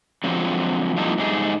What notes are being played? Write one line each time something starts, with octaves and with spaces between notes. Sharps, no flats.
D3 F3 F#3 G#3 C4
F3 G3 A3 A#3 D#4 E4
G#2 G3 A3 D#4 G#4